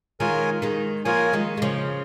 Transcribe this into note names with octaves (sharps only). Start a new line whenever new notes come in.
D#3 G#3 F4 A#4 C#5 G#5
D#3 G#3
F3 A#3 F4 A#4 C#5 G#5
D#3 G#3
G#3
C#3 F3